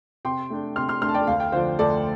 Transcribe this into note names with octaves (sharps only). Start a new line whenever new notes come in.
C3 G5 C6
A3 D4
C3 C6 F6
C6 F6
A3 D4 C6 F6
A5
D5 G5
D2 F5
G5
D3 F3 D4 C5 F5
D2 A4 D5